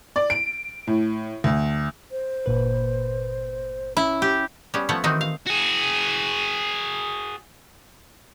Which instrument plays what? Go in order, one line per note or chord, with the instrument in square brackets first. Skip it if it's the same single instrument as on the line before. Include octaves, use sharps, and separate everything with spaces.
[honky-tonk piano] D5
D7
A2
D2
[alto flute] C5
[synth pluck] G1 A#2 B4
[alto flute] C#4 [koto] E4
[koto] G4
G3 B3 C#4
F3 A3 B3 C#5 F#5
D#3 E3 C4 D#4 F#4
F5
[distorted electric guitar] F#4 G#4